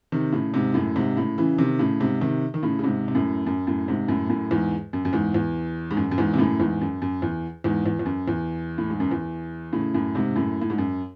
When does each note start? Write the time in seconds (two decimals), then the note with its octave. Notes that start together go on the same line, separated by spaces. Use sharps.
0.12 C3 D#3
0.33 A2 C#3
0.54 G#2 C3
0.74 F#2 A2
0.96 G#2 C3
1.17 A2 C#3
1.38 C#3 E3
1.58 C3 D#3
1.79 A2 C#3
2.00 G#2 C3
2.21 C3 D#3
2.54 D#3
2.63 A2 C#3
2.79 C#3
2.84 G#2 C3
3.08 C3
3.15 F#2 A2
3.47 F#2
3.67 F#2 A2
3.88 G#2 C3
4.08 F#2 A2
4.30 F#2 A2
4.51 E2 G#2
4.93 F#2
5.05 F#2
5.13 E2 G#2
5.34 E2
5.91 G#2
5.97 F#2
6.11 F#2
6.18 E2 G#2
6.34 C3
6.39 F#2 A2
6.60 E2 G#2
6.81 F#2
7.02 F#2
7.22 E2
7.64 E2 G#2
7.86 E2
7.99 E2
8.06 F#2
8.28 E2
8.78 A2
8.90 G#2
9.00 F#2
9.11 E2
9.73 A2 C#3
9.94 F#2 A2
10.15 G#2 C3
10.36 F#2 A2
10.61 A2
10.70 G#2
10.78 F#2